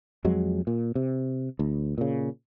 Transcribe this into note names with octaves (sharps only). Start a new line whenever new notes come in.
F2 F#3 G#3
A#2
C3
D2
A#2 C#3